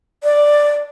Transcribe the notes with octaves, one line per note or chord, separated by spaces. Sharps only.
D5